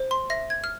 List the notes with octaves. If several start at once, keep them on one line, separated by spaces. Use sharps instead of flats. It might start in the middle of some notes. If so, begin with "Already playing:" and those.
Already playing: C5
C6
E5 A#6
G#6
F6